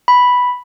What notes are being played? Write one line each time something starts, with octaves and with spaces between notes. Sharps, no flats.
B5